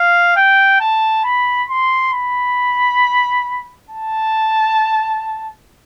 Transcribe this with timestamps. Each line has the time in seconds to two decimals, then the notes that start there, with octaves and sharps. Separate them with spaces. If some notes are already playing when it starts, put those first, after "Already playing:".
Already playing: F5
0.36 G5
0.80 A5
1.24 B5
1.69 C6
2.13 B5
3.90 A5